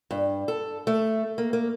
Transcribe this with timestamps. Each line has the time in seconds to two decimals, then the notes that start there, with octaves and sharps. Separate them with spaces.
0.11 G2
0.48 A4
0.87 A3
1.38 A#3
1.53 A#3